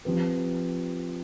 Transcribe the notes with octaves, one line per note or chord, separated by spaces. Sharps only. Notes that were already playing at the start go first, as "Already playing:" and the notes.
F3 C4 G4 B4